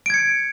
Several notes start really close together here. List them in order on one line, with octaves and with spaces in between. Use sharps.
D7 G#6 C#7